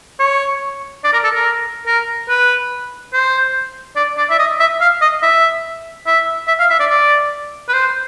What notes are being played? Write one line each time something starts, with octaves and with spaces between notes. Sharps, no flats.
C#5
D5
A#4
A4
A#4
A#4
B4
C5
D5
D5
E5
D#5
E5
F5
D#5
E5
E5
E5
F5
E5
D5
D5
B4
C5